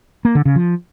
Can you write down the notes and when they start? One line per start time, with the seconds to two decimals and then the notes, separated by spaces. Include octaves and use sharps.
0.25 A#3
0.35 D3
0.45 C#3
0.56 F3